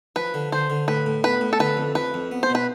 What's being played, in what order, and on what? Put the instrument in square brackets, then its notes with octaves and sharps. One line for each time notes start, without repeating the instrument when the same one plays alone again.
[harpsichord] F3 [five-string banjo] B4
[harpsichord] D3
[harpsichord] D3 [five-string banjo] C5
[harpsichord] D3
[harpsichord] A2 [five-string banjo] B4
[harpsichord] A2
[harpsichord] B3 [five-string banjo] B4
[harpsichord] A2
[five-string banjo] A4
[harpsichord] D3 [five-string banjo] B4
[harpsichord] F2
[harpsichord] F3 [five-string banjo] B4
[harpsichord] F2
B3
[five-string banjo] C5
[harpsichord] B2
[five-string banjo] B4